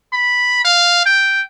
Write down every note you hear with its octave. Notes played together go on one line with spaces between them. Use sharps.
B5
F5
G5